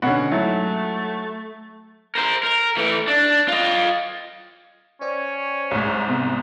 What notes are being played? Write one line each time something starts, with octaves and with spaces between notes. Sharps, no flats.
D#2 B2 D3 C#4 F#5
G#2 F#3 A3 E4
A#4 C5
A#4
E3 A3
D4
F4 D#5
C#4 C5 D5 G5
C2 G#2
C3 B3 D#6